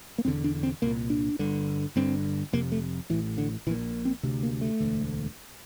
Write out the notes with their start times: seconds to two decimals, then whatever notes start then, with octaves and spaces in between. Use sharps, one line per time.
0.18 A#3
0.25 E1 E2 D3 C4
0.44 D4
0.63 C4
0.82 C2 A#2 A#3
1.10 D4
1.39 G1 G2 D3
1.96 G1 G2 D3 C4
2.53 F1 F2 C3 A#3
2.72 A3
3.10 A1 A2 E3
3.38 D3
3.66 A#1 E3
3.70 A#2
4.05 C4
4.23 D2 C3
4.43 A#3
4.61 A3
4.80 E1 D2 D3